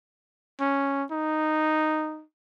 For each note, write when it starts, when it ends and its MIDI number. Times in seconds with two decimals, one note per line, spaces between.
0.60 1.04 61
1.11 2.24 63